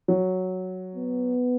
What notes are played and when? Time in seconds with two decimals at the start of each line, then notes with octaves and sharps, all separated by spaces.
0.08 F#3
0.95 B3